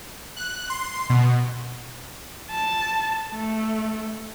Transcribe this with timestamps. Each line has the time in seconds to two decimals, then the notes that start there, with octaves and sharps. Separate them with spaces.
0.36 F#6
0.70 C6
1.10 B2
2.51 A5
3.32 A3